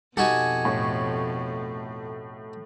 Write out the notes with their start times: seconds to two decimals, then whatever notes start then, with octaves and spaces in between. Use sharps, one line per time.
0.17 F2 B2 D#4 F#4 G4 A4 G#5
0.65 A2 C#6